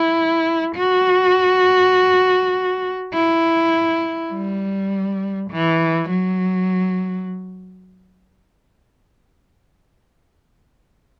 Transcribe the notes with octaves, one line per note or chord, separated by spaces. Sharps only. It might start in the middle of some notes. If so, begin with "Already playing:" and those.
Already playing: E4
F#4
E4
G3
E3
F#3